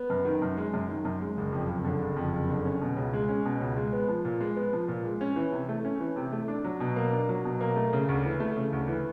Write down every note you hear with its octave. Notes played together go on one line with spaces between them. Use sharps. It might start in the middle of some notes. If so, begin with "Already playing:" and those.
Already playing: B3
F#2
D#3
F#2
G#3
F#2
D#3
F#2
G#3
F#1
F2
F#1
D3
F#1
F2
F#1
D3
C#4
B2
C#2
G#3
C#4
B2
C#2
G#3
B3
F3
A#2
G#3
B3
F3
A#2
G#3
C#4
E3
C3
A3
C#4
E3
C3
A3
D4
F#3
B2
A#3
D4
F#3
B2
A#3
A3
C#3
D2
E3
A3
C#3
D2
E3